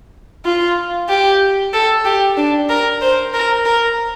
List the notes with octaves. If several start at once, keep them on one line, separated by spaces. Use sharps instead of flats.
F4
G4
A4
G4
D4
A#4
C5
A#4
A#4